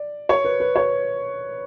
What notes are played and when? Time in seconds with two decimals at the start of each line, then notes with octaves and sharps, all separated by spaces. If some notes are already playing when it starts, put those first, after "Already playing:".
Already playing: D5
0.29 C#5
0.45 B4
0.60 B4
0.76 C#5